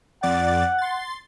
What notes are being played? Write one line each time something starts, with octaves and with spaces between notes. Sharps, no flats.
F2 D5 F#5 A6
C6 A6